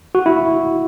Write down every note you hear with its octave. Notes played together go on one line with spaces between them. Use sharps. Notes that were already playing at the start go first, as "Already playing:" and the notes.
F#4
E4